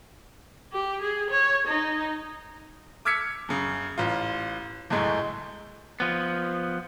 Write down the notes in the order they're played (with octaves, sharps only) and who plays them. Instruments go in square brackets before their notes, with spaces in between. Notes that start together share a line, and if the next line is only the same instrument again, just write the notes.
[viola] G4
G#4
C#5
D#4
[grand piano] D6 E6 F6 G#6 B6 C#7
F#2 C#3
A1 F4
C#2 F#2 A2 G#3 A3
[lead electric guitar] F3 B3